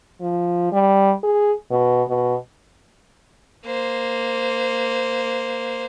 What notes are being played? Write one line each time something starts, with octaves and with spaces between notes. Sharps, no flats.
F3
G3
G#4
B2
B2
A#3 C5